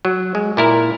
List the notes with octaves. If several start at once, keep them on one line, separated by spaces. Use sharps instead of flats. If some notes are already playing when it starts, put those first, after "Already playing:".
F#3
G#3
A#2 E4 A#4